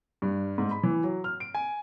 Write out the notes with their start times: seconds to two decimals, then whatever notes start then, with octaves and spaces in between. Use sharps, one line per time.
0.22 G2
0.58 G#2
0.71 B5
0.83 E3
1.03 F#3
1.24 F6
1.40 D7
1.55 G#5